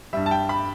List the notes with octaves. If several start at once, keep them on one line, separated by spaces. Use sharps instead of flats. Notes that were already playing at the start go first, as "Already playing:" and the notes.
G2 G3 E5
A5
G5
B5